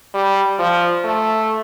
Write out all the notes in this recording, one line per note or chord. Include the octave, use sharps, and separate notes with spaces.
G3
F3
A3